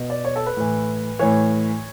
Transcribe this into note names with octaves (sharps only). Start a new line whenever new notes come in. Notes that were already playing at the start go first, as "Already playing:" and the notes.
Already playing: B2
D5
C#5
A4
B4
A2 E3
A2 E3 C#5